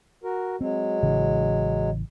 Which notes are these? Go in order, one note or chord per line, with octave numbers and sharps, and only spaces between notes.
F#4 A#4
F#3 G#3 C4
A1 C#3 E3